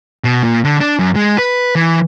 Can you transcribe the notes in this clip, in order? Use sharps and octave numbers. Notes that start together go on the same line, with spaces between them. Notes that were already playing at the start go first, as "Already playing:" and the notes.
B2
A#2
D3
D4
F#2
G#3
B4
E3